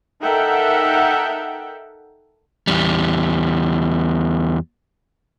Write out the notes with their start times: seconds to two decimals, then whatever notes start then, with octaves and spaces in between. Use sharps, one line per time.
0.22 D#4 A4 A#4 E5 F#5 G5
2.67 E2 G3